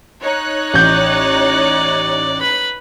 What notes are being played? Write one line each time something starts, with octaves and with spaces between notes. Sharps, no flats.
D#4 C#5 F#6
A1 D5 G6
B4 B5